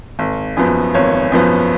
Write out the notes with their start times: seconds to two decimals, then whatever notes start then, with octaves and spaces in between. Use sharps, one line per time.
0.19 G#1
0.57 F#2 F3 B3
0.94 G#1 C#5
1.32 F#2 F3 B3